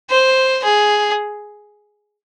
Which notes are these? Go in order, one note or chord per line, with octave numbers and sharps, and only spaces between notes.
C5
G#4